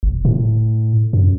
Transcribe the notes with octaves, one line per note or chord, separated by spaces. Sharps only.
E1
A2
F#2